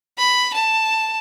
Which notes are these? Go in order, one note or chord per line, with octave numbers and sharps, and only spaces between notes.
B5
A5